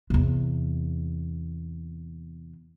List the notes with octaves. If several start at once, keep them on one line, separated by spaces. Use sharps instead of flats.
E2 C3